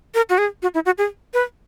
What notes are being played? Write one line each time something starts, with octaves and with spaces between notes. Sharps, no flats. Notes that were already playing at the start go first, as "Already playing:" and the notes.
A#4
F#4
G#4
F#4
E4
F#4
G#4
B4